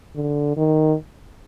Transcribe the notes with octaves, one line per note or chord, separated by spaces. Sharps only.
D3
D#3